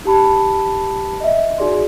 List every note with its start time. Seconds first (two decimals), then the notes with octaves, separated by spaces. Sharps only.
0.04 D#4 G4 A5 B5
1.21 D#5 E5
1.58 D#4 F#4 G#4 D5 C6